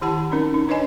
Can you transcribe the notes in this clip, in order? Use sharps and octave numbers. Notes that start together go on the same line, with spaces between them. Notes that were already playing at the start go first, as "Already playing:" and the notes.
D#3 E4 G4 F#5 A5 B5
C4 C#4 D#4 A#4
D#4
C#4 D4 B4 C#5 D#5 G#5